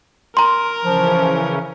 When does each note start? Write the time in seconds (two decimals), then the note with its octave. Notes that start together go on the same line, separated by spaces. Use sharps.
0.37 A#4 A#5 C6
0.85 C#3 E3 F3 C#4